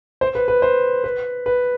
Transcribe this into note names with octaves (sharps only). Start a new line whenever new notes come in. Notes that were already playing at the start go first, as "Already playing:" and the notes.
C5
B4
B4
C5
B4
B4